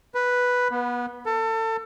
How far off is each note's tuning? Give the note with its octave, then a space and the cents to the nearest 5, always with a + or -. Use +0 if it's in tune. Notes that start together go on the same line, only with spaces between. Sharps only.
B4 +0
B3 -25
A4 +30